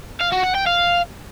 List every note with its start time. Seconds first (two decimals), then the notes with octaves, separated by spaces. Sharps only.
0.21 F5
0.32 F#4
0.44 F#5
0.55 G5
0.67 F5